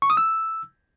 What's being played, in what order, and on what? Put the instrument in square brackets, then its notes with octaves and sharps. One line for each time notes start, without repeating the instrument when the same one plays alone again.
[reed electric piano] C#6
D#6
E6